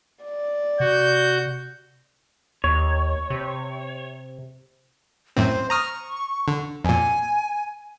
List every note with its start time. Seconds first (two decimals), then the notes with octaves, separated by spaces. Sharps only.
0.24 D5
0.80 C3 F#4 G6
2.64 D#2 C#5
3.30 C3
5.37 F#2 A2 C4 C5
5.70 A#5 C#6 D#6 F6
6.48 D3
6.85 F2 A#2 G#5